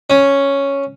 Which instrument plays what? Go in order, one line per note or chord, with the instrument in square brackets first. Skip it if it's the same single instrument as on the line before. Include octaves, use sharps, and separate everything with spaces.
[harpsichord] C#4